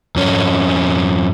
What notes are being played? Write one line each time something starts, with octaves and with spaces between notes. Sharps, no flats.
F2 C#4